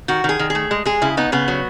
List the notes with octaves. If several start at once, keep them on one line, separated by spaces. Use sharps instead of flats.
D#3 F#4
D#3 G#4
D#3
G#4
A3
G#3
G#3 G#4
C#3 E4
B3 D#4
C#3 B3
F#3